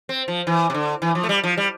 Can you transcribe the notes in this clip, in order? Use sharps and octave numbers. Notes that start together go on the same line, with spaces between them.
C4
F3
E3
C3
D3
E3
F3
A3
G3
F3
G3